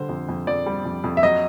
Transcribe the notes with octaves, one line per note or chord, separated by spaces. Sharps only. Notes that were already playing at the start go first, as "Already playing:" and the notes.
Already playing: D3 G3 C5
F2
F2
F2 D5
G3
F2
F2
E5
F#3 D#5